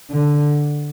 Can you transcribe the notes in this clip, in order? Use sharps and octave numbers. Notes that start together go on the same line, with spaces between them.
D3